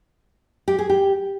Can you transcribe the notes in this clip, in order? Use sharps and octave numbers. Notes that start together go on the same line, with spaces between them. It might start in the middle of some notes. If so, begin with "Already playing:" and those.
G4
G#4
G4